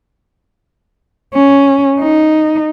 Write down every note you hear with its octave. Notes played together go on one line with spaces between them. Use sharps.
C#4
D#4